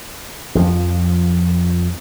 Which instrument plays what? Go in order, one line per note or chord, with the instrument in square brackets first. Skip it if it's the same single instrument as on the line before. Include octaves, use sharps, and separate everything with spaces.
[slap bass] F2 F3